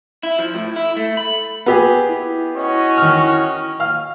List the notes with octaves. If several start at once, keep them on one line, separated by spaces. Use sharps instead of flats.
E4
F3
A2
E4
A3
B5
B3 G4 G#4
E4
C#4 F#4 D#5
D#3 F6
F5 F6